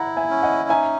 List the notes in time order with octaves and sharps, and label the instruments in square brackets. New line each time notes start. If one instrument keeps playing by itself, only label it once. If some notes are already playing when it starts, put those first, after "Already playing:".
Already playing: [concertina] E4 [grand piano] F#5 A#5
[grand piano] E5 G#5
[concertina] C#4
[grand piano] D#5 F#5
[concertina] D#4 [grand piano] E5 G#5